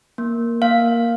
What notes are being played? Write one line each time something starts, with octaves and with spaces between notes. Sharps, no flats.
A#3
A#3 F5